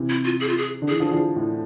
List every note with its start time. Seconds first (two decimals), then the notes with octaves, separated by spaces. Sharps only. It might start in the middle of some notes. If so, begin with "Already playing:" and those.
Already playing: C3 E3
0.09 E4
0.25 F4
0.41 G#4
0.49 F4
0.58 G#4
0.82 D3
0.88 E3 G#4
1.00 D3 F3
1.07 E3
1.12 D3 F3
1.36 A2